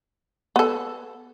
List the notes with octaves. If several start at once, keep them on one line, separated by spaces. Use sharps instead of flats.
B3 A4